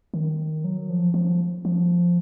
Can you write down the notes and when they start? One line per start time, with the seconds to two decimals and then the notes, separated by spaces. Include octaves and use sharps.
0.14 D#3
0.64 F#3
0.90 F3
1.14 F3
1.65 F3